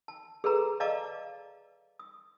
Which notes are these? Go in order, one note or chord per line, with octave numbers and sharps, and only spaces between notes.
A5
G#4 A4 B4 A#5
D5 D#5 F5 A5 A#5 D6
D#6